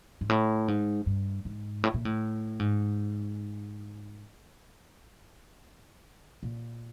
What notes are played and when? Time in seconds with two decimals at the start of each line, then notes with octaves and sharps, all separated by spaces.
0.21 G#2
0.29 A2
0.68 G#2
1.06 G2
1.45 G#2
1.83 A2
1.94 A#2
2.05 A2
2.59 G#2
6.43 A#2